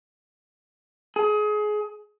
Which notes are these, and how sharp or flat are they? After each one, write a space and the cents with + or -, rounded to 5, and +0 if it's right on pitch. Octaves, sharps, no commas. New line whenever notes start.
G#4 +25